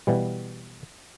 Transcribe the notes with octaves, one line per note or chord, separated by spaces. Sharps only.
B2 E3 G3